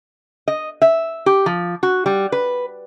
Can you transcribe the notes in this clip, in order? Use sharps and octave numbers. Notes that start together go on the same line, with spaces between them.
D#5
E5
G4
F3
F#4
G3
B4